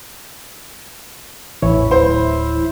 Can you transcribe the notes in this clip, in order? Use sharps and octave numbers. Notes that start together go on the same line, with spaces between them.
A1 E2 E3 E4 C#5
D1 C5